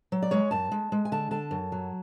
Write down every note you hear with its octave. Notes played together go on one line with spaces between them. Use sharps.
F#3
D5
G#3 C#5
F#2 A5
G#3
G#3
G#5
D3 A5
D3 A5
F#2
F#3